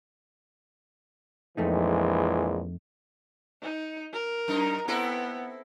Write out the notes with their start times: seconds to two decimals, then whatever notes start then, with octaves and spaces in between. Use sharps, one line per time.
1.57 A#1 F2 E3 G#3 A3 D#4
3.62 D#4
4.13 A#4
4.48 F#2 D#4
4.88 B3 C4 E4 A4